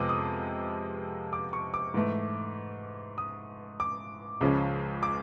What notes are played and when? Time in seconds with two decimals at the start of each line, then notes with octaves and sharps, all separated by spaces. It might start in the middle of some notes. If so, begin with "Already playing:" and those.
Already playing: F2 C3 F3 G#3 B3 D6
0.09 D#6
1.33 D6
1.53 C#6
1.74 D6
1.94 G#2 E3 A3
3.18 D#6
3.80 D6
4.41 C#2 C#3 F3 G#3 C#4
5.03 D6